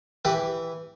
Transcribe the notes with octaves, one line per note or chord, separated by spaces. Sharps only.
E3 G4 B4